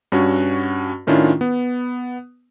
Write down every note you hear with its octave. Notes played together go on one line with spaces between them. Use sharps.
G2 C#4 F#4
A2 D#3 C#4 D4 E4 F4
B3